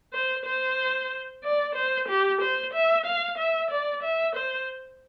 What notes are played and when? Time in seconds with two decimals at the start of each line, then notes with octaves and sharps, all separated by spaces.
0.13 C5
0.45 C5
1.44 D5
1.75 C5
2.08 G4
2.41 C5
2.73 E5
3.06 F5
3.38 E5
3.71 D5
4.03 E5
4.36 C5